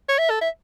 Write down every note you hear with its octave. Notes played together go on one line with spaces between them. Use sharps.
C#5
E5
A4
E5